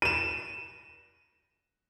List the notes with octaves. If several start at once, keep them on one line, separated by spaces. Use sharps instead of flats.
D#7 E7